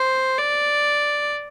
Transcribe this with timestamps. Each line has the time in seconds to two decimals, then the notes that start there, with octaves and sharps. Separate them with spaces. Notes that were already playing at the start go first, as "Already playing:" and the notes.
Already playing: C5
0.38 D5